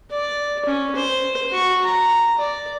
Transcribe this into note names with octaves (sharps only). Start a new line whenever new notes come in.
D5
C#4
C5
F#4 C#6
A#5
D5